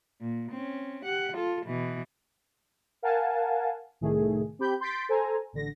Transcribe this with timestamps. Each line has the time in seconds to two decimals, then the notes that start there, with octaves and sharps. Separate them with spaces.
0.21 A#2
0.51 C4 C#4
1.04 G4 F#5
1.35 F4 A4
1.65 B2 E3
3.02 A#4 F5 F#5 G#5 A5
4.01 C2 A2 D#3 A3 G#4
4.59 C4 G4 B5 G6
4.81 C6 G6 A6 B6 D7
5.09 A4 C5 G#5 A#5
5.53 A1 D3 A#6